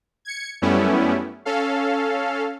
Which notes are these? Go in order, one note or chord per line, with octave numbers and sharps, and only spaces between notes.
G#6 C#7
F#2 G3 A3 B3 C#4 E4
C#4 A4 F5